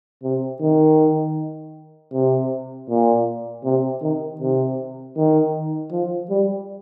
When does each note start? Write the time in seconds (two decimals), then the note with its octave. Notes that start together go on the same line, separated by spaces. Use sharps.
0.23 C3
0.62 D#3
2.13 C3
2.89 A#2
3.64 C3
4.02 D#3
4.41 C3
5.17 D#3
5.92 F3
6.30 G3